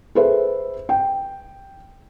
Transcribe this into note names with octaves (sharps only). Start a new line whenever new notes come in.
G#4 A4 B4 C5 E5
G5